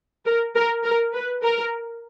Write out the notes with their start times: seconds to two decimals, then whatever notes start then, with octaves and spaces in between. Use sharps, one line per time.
0.26 A#4
0.55 A#4
0.85 A#4
1.14 B4
1.43 A#4